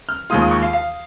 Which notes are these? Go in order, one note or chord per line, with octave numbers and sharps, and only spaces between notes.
F6
D#2 D#3 G#3 F4 D#6
D#6
C#6
F5
F5